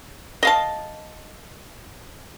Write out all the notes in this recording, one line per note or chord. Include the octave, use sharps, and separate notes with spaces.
D#5 F5 A5